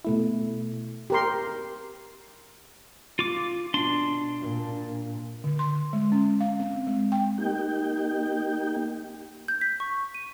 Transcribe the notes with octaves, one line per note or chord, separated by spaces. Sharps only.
B2 A3 E4
G4 A#4 C6
F4 D6
B2 D4 C6
A#2
D3
C6
G#3
C#4
F5
C4
G#3
G5
A#3 D#4 G4 G5
G6
B6
C#6
D#7